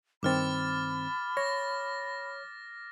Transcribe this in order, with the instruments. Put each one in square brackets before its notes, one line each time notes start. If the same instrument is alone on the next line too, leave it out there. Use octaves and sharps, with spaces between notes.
[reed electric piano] G2 D#3 C4 [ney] B5 [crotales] D6 F6 A6
[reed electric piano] C#5 [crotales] A#6